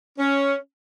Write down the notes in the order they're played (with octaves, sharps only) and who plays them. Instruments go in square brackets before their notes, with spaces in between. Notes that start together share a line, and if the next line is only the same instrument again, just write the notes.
[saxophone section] C#4